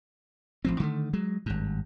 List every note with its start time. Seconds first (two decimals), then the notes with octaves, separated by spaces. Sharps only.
0.65 A1 F3 C4
0.80 D3 D#3 A3
1.13 F#3 G#3
1.46 G#1 G2